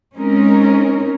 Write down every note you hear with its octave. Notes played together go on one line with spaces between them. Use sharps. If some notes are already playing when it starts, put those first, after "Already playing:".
G#3 C4 C#4 D#4 A#4